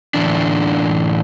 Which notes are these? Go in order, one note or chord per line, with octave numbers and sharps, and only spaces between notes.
A2 D3 E3 D4